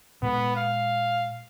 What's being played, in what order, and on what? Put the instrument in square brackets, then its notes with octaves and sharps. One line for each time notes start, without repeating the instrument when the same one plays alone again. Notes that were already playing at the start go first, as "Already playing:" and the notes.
[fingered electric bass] A#2 G#3 [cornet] B3
[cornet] F5